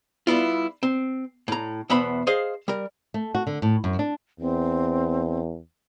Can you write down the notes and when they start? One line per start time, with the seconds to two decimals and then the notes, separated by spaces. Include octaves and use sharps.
0.27 G3 B3 E4 F4
0.83 C4
1.48 A2 A#5
1.90 E2 B2 B3 C5 E5 B5
2.27 G#4 C5 D#5 F5
2.68 G3 A#4
3.14 A3
3.35 F#4
3.47 D3
3.62 A2
3.84 F#2
3.99 D4
4.40 E2 C4